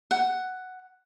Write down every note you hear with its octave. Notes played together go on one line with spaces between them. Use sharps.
F#5